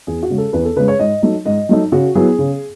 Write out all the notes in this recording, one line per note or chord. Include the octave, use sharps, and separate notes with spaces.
E2 G#4
F#4
C#3 G#3
A4
E2 B4
A4
C#3 G#3 B4
C#5
G#2 D#5
F#3 A3 D#4
G#2 D#5
F#3 A3 D#4
C#3 F#4
F#3 B3 E4 G#4
C#3